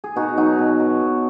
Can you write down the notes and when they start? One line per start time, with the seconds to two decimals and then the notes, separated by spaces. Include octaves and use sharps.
0.04 G#4
0.16 B2 D#4 F#4
0.37 F#3 D#4 F#4
0.59 B2
0.80 F#3
1.01 B2